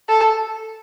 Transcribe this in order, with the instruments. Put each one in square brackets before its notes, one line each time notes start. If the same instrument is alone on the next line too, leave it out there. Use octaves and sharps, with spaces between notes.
[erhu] A4